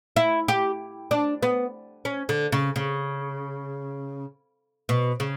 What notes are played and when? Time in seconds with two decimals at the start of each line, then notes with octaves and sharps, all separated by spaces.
0.16 E4
0.48 G4
1.11 D4
1.42 B3
2.05 C#4
2.29 D3
2.52 C#3
2.76 C#3
4.89 B2
5.20 C#3